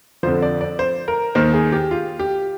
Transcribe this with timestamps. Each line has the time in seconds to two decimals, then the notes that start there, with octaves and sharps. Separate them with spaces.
0.23 F2 D3 F3 C5
0.42 D5
0.61 D5
0.79 C5
1.08 A#4
1.35 D#2 D#3 C5
1.54 G#4
1.72 G4
1.91 F4
2.19 G4